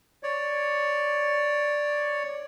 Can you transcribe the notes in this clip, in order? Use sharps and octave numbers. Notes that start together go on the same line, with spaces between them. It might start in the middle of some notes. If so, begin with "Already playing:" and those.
C#5 D5